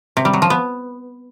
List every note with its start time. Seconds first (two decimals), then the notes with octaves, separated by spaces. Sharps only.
0.17 C3
0.25 G3
0.33 F#3
0.42 F3
0.50 B3